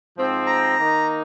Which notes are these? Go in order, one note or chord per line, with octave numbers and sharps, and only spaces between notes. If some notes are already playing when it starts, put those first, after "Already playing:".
G#2 F3 C4
A#5
D#3 A#3 D#4